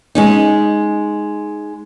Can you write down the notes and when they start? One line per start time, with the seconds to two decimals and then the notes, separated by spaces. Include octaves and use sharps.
0.15 G#3 C#4 D#4